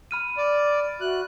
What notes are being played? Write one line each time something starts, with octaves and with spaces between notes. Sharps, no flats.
B5 F6 D#7
D5
F#4 E5 F#6